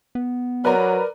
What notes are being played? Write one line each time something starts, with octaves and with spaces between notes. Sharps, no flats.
B3
F#3 A#4 B4 D5 A#5